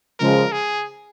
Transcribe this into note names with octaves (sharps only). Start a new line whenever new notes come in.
C#3 F3 G#3 A#4
G#4